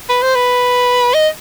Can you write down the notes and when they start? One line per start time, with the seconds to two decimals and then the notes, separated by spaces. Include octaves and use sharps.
0.10 B4
0.23 C5
0.35 B4
1.15 D#5